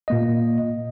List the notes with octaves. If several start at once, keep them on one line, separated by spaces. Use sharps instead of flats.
A#2 A#3 D#5